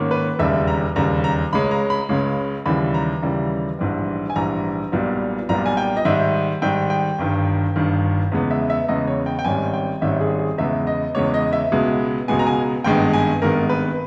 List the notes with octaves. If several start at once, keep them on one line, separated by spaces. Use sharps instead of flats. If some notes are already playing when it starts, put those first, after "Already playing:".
Already playing: G#2 D#3 A#3 C#4
B4
E1 D#2 C#3 G3 E5
A#5
E1 D#2 C#3 G3 A#5
A#5
C#2 C#3 G#3 C#4 B5
A#5
B5
C#2 C#3 G#3 C#4
D#2 C#3 E3 G3 B5
A#5
D#2 C#3 E3 G3
A#1 G#2 E3 G3
G#5
A#1 G#2 E3 G3 A#5
B1 A#2 G3 B3
B1 A#2 G3 B3 A#5
G#5
G5
D#5
G#2 D#3 G3 E5
G#2 D#3 G3 G5
G5
G1 G2 D#3
G1 G2 D#3
E2 C#3 G#3 B3
E5
E5
E2 C#3 G#3 B3 D#5
C#5
G5
G5
G#1 G#2 D#3 G3 C#4 G#5
G5
G#1 G#2 D#3 G3 C#4 E5
G#4
G#4
E2 C#3 G#3 B3 E5
D#5
E2 C#3 G#3 B3 C#5
D#5
E5
C#2 B2 G#3 B3
C#2 B2 G#3 B3 G#5
A#5
G#5
G#1 G2 D#3 G#3 B3 G5
G#5
G#1 G2 D#3 G#3 B3 A#4
B4